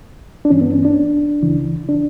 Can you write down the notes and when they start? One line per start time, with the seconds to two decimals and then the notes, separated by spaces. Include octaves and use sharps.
0.45 D4
0.50 G2 E3 C#4
0.61 B3
0.74 C#4
0.85 D4
1.43 C#2 C#3 E3
1.89 D4